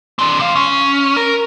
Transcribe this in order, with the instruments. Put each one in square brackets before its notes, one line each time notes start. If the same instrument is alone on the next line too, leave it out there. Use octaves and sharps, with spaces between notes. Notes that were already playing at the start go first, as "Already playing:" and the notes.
[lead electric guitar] C4 D4
C3 F5
C#4
A#4